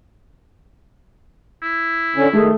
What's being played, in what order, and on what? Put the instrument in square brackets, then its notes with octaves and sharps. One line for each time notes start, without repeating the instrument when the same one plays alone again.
[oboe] E4
[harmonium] D3 C#4
[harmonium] D#3 [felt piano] A3 [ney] G#4